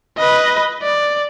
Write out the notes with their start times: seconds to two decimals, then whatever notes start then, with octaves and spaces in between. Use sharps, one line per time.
0.18 B4 D#5
0.83 D5